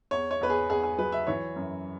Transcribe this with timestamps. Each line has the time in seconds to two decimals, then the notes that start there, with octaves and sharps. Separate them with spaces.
0.11 E2 C#5
0.31 C#5
0.41 E2 B4
0.50 G#4
0.70 E2 G#4
0.83 G#4
0.98 F#3 B4
1.12 E5
1.27 E3 C#5
1.56 F#2